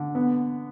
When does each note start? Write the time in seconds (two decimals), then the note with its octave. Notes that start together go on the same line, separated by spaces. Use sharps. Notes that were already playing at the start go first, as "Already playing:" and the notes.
Already playing: D3
0.15 B3